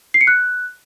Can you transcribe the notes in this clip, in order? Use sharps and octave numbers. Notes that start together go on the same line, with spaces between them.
C7
C#7
F#6